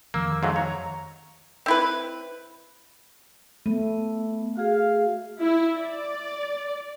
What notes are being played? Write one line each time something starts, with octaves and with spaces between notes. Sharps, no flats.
F2 D#3 F3 A#3 E6
G#2 F#3 A3 F5
C#5 A#5
C4 E4 B4
A3 B3
F#4 G#4 F5
E4
D5